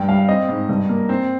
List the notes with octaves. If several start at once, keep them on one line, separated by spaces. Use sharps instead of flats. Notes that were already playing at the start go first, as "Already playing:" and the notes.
Already playing: G2 G5
G3 F5
C4 D#5
G#2
G2
A#3
C4